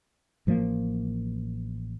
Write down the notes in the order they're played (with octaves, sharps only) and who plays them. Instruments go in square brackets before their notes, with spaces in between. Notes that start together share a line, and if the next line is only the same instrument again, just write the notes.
[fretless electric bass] A1 F3 F#3 A#3